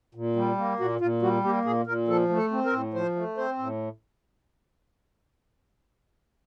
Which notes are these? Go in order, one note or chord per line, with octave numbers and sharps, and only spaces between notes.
A#2
G3
A#3
A#2 F#4
A#2 F4
G3 F#4
A#3 G4
A#2 G#4
A#2 A#4
F3 A4
A3
A4
C4
A#4
A2
F3 C5
A3
C4 C5
A2